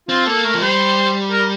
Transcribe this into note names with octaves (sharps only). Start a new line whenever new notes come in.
C4 F4
A#3 A4
A3 A#4
F3
G3 C5
A#4